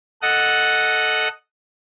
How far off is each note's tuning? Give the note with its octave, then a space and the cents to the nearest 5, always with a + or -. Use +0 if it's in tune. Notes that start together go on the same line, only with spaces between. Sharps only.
A4 +0 D#5 +0 F#5 +0